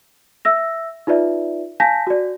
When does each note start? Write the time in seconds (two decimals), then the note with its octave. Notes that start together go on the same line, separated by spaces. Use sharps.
0.45 E5 E6 A#6
1.07 D#4 F4 B4 D5 E5
1.80 F5 G#5 A5 G6 A#6 B6
2.07 F#4 D5